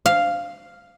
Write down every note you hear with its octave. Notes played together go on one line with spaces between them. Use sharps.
F5